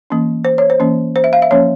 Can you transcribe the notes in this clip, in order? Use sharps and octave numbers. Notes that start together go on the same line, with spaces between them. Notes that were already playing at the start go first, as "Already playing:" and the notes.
E3 A#3 C#4
C5
C#5
C5
E3 A#3 C#4
C5
E5
F5
E5
F3 A#3 C#4 C#5